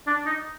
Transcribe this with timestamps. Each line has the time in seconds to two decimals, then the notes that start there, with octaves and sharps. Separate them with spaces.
0.07 D4
0.26 D#4